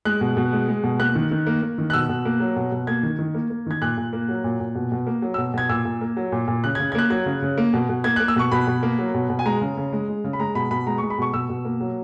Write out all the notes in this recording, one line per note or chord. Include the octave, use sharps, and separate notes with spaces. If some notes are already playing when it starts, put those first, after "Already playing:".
G#3 F#6
B2
B2
G#3
G#3
B2
A#3 F#6
D#3
D#3
A#3
A#3
D#3
F#6
B2 E6
B2
A#3
F#3
B2
B2
A#3 G#6
D#3
D#3
A#3
A#3
D#3 G#6
A#2 F#6
A#2
A#3
F#3
A#2
A#2
B2
B2
A#3
F#3
B2 E6
B2 G#6
A#2 E6
A#2
A#3
F#3
A#2
A#2
C#3 F#6
C#3 G#6
G#6
A#3 F#6
F#3 G#6
C#3
C#3
A#3
B2
B2
A#3 G#6
A#3 F#6
E6
B2 C#6
B2 B5
B2
A#3
F#3
B2
B2
G#5
G#3 A#5
C#3
C#3
G#3
G#3
C#3
B5
G#3 A#5
B2 B5
B2 B5
G#3 A#5
G#3 C#6
B5
B2 C#6
B2 E6
B2
A#3
F#3